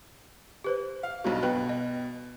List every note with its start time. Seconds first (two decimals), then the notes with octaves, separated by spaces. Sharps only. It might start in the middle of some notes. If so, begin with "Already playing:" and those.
0.64 G4 B4 C5
1.03 F5
1.24 B1 G2 B2 F#4
1.43 B2 B4 D#5 G5
1.69 D#5